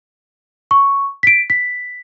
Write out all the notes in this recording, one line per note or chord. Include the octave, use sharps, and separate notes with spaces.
C#6
B6 D7
B6